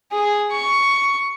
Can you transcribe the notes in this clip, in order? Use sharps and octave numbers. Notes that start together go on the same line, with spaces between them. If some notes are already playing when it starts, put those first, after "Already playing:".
G#4
C#6